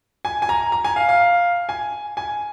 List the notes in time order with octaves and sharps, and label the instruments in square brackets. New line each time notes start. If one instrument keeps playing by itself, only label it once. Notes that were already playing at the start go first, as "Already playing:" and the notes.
[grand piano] G#5
G#5
A#5
A#5
G#5
F5
F5
G#5
G#5